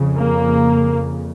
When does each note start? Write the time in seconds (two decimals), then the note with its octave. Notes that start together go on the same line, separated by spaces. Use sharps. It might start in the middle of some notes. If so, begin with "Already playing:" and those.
Already playing: F2 C#3
0.17 A#3